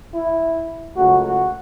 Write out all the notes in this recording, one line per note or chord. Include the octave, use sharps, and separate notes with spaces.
E4
C#2 C#3 F#3 A3 F#4
F#4